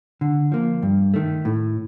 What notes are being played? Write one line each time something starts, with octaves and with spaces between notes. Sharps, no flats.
D3
F3 A#3
G2
D#3 A3
A2